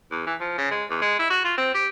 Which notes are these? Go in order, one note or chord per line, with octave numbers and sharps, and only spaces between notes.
E2
E3
F3
C#3
G#3
E2
G#3
E4
F#4
F4
C4
G4